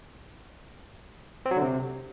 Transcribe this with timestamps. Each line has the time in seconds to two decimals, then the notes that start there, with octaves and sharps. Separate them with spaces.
1.46 C4
1.51 F#3
1.57 D3
1.62 C3